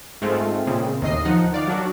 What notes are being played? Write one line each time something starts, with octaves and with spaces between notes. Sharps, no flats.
G#2 G#3 A3 C4 F4
A#2 C#3 C4
D#2 A2 D#5 C7
F3 D#4 F#5
D#3 D5 F5
F#3 D4 F#4